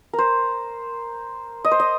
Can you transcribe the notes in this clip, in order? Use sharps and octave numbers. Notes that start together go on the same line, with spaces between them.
A#4
C5
D#5
C5
D#5